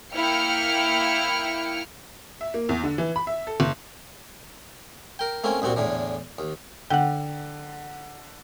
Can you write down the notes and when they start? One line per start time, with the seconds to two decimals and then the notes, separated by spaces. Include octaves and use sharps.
0.14 A#3 E4 G5 F6 C#7
2.41 E5
2.54 A#3
2.69 E2
2.84 D3
2.98 E3
3.16 B5
3.27 E5
3.47 A4
3.60 F#1
5.19 A#4 G5
5.44 A3 A#3 C4 C#4
5.62 C2 A#2 C4 F#4
5.76 E2 A2 D3 E3
6.39 D#2
6.90 D3 F#5 G5